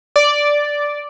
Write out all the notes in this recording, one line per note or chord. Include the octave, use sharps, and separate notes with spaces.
D5